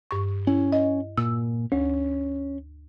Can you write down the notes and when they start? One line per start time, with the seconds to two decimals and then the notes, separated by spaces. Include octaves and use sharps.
0.11 G2 C#6
0.47 C#4 E4
0.72 D#5
1.18 A#2 E6
1.72 D2 C#4